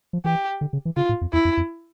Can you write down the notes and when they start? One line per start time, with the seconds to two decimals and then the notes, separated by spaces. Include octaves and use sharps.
0.13 F3
0.24 E3 G4
0.61 D3
0.73 C#3
0.85 E3
0.96 C#3 F4
1.09 A2
1.21 F2
1.33 E2 E4
1.45 F2
1.57 F2